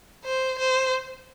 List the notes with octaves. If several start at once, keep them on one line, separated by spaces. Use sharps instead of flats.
C5
C5